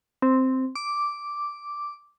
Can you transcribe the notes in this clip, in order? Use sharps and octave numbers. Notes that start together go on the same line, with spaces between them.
C4
D6